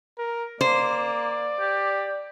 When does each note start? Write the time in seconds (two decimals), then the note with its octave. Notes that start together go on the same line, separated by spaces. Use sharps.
0.18 A#4
0.61 A#3 C5 D5
1.60 G4